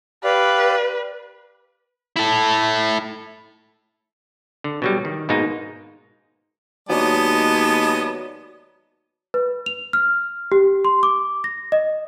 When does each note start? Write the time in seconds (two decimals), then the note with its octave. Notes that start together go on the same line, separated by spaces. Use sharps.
0.24 G4 B4 D5 F5
2.17 E4 A4
4.64 D3
4.82 B2 F#3 G3
5.05 D#3
5.29 G#2 B2 G#3 A#3 D#4
6.89 D#2 F#3 G#3 B3 D4 D#5 A5
9.34 B4
9.66 F7
9.93 F6
10.52 G4
10.85 C6
11.03 D6
11.44 A#6
11.72 D#5